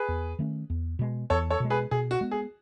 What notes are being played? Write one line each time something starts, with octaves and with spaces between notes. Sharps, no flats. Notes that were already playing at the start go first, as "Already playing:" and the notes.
Already playing: G#4 B4
E2
D#3 A3 C#4
E2
B2 G#3
E2 A4 C#5
A4 C#5
B2 G#3
G#4 B4
B2 G#4
F#4
G#3 B3
G#4